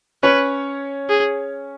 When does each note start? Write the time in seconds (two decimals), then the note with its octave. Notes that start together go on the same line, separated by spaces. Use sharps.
0.23 C#4 B4 C#5
1.09 G#4